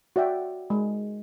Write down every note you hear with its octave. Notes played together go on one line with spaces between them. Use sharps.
F#4 D5 E5 G5
G#3